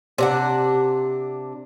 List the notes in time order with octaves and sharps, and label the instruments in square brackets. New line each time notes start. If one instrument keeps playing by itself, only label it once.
[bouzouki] C3 D4 F#5